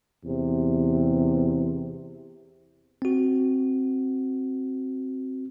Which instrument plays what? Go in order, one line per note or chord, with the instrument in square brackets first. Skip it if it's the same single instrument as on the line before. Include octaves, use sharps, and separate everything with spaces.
[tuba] E2 [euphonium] C3
[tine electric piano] C4 F#4